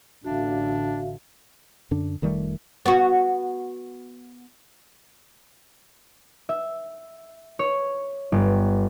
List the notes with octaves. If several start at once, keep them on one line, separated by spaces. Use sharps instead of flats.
A1 D3 D4 F#4 E5 F5
F#2 D3 D4
F1 D#3 G3 A3
B3 F#4
E5
C#5
G1